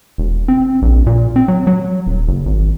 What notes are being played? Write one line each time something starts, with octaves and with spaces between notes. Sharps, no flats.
E1
C4
A#1
A#2
C4
F#3
F#3
D#1
F#1
G#1